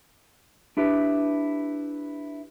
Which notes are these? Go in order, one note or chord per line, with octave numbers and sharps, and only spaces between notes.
D4 E4 G4 B4